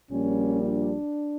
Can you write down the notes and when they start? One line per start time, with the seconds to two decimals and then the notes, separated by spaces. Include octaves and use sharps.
0.11 A#1 A#2 G3 C#4
0.65 D4